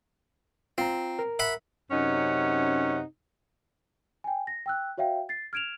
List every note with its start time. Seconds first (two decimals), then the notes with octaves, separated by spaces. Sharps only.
0.78 C4 F4 A#5
1.19 A#4
1.39 E5 F#5 B5
1.91 F#2 C3 C#4 D#4 F#5
4.24 G5 G#5
4.47 A#6
4.66 G5 E6 F#6
4.97 F#4 C#5 E5 F5 G5
5.29 A6 C7
5.53 F6 G#6 D7 E7 F7